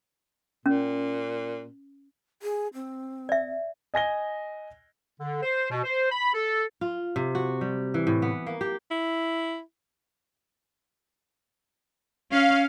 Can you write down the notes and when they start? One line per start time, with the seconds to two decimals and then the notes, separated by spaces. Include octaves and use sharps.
0.66 A#2 C#4
2.43 G#4
2.74 C4
3.29 D5 E5
3.94 D#5 G#5 A#6 G7
5.20 D3
5.43 C5
5.71 B2
5.84 C5
6.12 B5
6.34 A4
6.81 F4
7.16 C3
7.35 F#4
7.61 G3
7.94 E3
8.07 A2
8.22 B3
8.47 A#3
8.61 G4
8.91 E4
12.31 C#4 F5